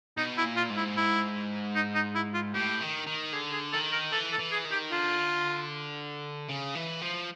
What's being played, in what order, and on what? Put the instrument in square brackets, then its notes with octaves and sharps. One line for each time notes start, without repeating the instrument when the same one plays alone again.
[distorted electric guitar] B2 [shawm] D#4
[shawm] E4
[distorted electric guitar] A#2
[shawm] F4
[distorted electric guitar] G#2
[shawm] E4
E4
D#4
D#4
E4
F4
[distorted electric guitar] A2 [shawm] G4
[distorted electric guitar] D#3
D#3
[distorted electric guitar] D3 [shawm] G#4
[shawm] G#4
[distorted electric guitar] D#3 [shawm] A4
[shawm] A#4
[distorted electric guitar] E3 [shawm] A4
[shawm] A4
[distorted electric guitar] E3
[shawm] G#4
[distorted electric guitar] D#3
[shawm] G4
[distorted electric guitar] D3 [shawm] F4
[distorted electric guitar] C#3
E3
F3